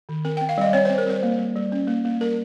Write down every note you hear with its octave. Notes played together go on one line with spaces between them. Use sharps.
D#3
C4 A#4
C4 G5
F5
G3 D#5
C4 C#5
C4 C5
A#4
G3 C5
A#3
G3
G3
C#4
A#3
A#3
G3 A#4